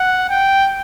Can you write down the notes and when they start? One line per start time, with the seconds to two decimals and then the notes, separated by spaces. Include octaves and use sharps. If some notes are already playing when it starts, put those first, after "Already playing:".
Already playing: F#5
0.30 G5